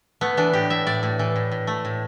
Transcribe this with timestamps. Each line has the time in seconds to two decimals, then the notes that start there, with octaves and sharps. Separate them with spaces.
0.21 A3 B3
0.37 E3 D4
0.53 A2 G4
0.70 A2 E5
0.87 A2 D5
1.03 A2
1.19 E3
1.36 A2
1.52 A2
1.67 A3
1.85 A2